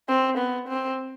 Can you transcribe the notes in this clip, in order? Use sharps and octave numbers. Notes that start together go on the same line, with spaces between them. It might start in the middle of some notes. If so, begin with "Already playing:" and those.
C4
B3
C4